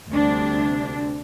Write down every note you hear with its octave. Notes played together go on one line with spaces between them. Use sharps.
D2 C3 G3 C4 D4